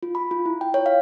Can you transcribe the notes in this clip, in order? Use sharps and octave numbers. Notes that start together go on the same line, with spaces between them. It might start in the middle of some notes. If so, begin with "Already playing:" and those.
F4
B5
F4
E4
G5
C#5
F5